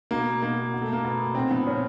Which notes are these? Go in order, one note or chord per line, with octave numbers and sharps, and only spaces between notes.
B2 A#3
B2 A#3
B2
A3
A#3
B2 B3
A#2 C4
F3 B3
A#2 C#4